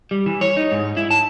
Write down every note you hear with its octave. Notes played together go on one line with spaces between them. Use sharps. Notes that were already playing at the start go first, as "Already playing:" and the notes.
G3
E3
C#5
D#4
G#2
E4
A5